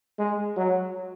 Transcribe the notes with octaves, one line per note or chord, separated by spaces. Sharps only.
G#3
F#3